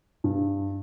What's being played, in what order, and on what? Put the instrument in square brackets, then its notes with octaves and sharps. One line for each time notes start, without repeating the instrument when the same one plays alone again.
[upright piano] G2